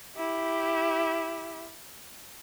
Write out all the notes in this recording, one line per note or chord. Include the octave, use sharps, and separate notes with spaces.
E4 G4